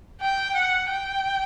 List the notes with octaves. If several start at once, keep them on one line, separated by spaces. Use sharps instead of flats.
G5
F#5
G5